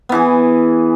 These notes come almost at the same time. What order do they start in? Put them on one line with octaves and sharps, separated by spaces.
B3 E3 G#4